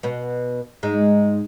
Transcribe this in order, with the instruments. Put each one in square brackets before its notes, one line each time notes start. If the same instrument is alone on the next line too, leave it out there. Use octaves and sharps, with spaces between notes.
[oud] B2 B3
G#2 G#3